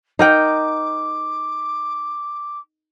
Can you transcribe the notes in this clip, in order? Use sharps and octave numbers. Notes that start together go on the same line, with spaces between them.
D#4 A#4 G5 D6